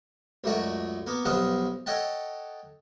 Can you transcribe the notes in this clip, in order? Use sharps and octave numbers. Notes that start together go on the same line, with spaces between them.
C#2 F#2 A3 F#4 D5
A#3 B3
B1 G2 F3 D#5 F5 F#5
A4 C#5 D#5 F#5 G5 A5